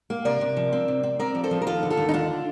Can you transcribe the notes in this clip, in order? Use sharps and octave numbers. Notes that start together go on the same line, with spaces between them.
A#3
C3 A#4 D5
C3
F3
C4
C3
C4
C4 A#4 D5
F3
A4 C5
F3
A#4
D#2 F4 A4
D3
F4 A4
D#2
D#4
D3 D4 F4